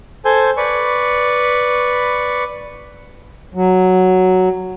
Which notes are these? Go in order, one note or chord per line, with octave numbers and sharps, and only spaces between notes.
A4 C5 G#5 G6
B4 D5 C#6
F#3